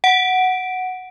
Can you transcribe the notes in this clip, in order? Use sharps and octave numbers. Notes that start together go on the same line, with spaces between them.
F#5 D7